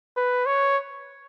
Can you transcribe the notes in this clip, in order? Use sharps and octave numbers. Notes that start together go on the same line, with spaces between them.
B4
C#5